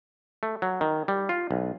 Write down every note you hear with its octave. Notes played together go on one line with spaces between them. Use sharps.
A3
F#3
D#3
G3
F4
B1